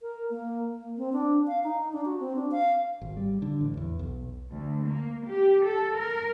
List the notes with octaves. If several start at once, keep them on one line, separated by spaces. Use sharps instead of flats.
A#4
A#3
A#3
C4
D4
F5
D#4
D4
F#4
C4
D4
F5
G#1
G3
D3
A1
E2
B1
D2
A#3
G4
A4
A#4